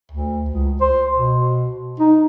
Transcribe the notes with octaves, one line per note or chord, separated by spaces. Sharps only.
D2
C#2
C5
B2
D#4